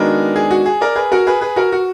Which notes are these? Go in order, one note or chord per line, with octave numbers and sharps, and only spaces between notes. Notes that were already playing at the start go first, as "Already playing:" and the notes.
Already playing: D#3 G#3 B3 D4 F#4 A#4
G#4
F#4
G#4
A#4 D5
G#4 B4
F#4 A#4
G#4 B4
G#4 B4
F#4 A#4
F#4